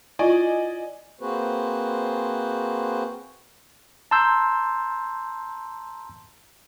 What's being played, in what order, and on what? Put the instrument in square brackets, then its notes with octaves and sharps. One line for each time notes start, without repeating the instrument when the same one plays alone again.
[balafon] E4 F4 [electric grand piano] D5 D#5 G#5
[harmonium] A#3 C4 F#4 G#4 B4 C5
[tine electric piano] A5 A#5 C6 E6 G6